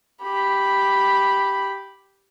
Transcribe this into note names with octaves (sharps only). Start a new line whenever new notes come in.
G4 B5